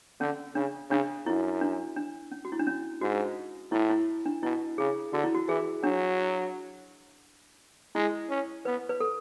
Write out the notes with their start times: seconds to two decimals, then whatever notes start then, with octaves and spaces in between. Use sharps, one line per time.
0.20 D3 C#4
0.55 C#3 D4
0.90 C#3 D4
1.26 F#2 E4
1.61 D4
1.96 D4
2.31 C#4
2.45 F#4
2.52 E4
2.59 D4
2.67 C#4
3.01 G#2 F#4
3.72 A2 E4
3.90 E4
4.26 D4
4.43 B2 E4
4.78 C#3 G#4
5.13 D3 F#4
5.24 E4
5.35 F#4
5.48 E3 G#4
5.83 F#3 D4
7.95 G#3 E4
8.30 C#4
8.65 B3 B4
8.89 B4
9.00 A4